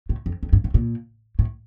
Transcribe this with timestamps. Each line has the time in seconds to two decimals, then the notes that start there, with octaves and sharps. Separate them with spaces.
0.09 A2
0.26 F2
0.43 F2
0.53 G2
0.64 A2
0.74 A#2
1.39 A2